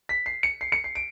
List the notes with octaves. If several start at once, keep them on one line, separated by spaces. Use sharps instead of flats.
B6
C7
C#7
C7
C#7
C7
D7